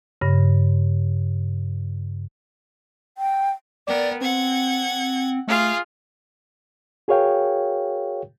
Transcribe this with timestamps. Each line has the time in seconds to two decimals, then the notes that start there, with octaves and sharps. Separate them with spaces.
0.21 G2 C#3
3.18 G5
3.87 B3 A#4 D5 G5
4.21 C4 F#5 G#6
5.47 A3 F4 G#4 F5
7.08 F#4 G#4 A#4 C#5 F5 G5